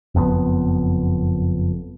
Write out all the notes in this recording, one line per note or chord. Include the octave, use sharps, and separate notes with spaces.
F#1 F2 C3 B3